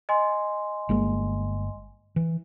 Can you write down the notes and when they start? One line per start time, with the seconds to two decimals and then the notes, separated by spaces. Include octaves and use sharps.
0.09 D#5 G#5 C6
0.89 G1 G#3 A#3
2.16 E3